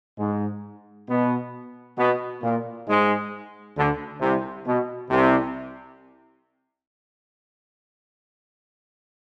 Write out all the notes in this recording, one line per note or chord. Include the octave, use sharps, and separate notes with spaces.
G#2 G#3
B2 B3
B2 B3
A#2 A#3
G#2 G#3
D2 D3
C2 C3
B2
C2 C3